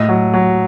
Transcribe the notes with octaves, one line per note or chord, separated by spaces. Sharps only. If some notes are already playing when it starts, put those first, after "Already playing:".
Already playing: A2 D#5
F#3
F#3